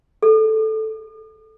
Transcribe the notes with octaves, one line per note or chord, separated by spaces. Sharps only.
A4